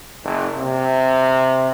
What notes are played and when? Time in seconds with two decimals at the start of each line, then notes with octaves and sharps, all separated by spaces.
0.24 F#1
0.57 C3